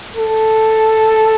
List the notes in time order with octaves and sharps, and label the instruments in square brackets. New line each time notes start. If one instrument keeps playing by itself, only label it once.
[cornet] A4